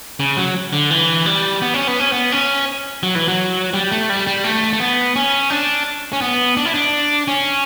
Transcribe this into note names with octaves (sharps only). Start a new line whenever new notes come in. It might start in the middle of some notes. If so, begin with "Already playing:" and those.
C#3
F#3
D3
E3
G3
B3
C#4
B3
C#4
B3
C#4
F#3
E3
F#3
G3
A3
G3
G3
A3
A3
B3
C#4
D4
C#4
B3
D4
E4
D4
C#4